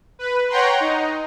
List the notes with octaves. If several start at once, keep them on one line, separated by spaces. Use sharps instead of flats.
B4
C#5 F#5 G5 A#5 C6
D#4